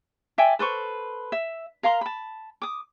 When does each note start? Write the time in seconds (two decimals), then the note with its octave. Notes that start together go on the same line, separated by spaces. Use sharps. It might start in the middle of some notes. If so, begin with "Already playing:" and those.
0.38 D5 E5 G5 G#5
0.59 A4 B4 C5 C#6
1.32 E5
1.83 A#4 F5 A#5 C6
2.01 A5 B5
2.62 D6 D#6